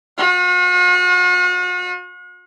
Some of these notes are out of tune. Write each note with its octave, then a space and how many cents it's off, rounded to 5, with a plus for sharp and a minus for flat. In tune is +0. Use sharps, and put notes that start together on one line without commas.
F#4 -45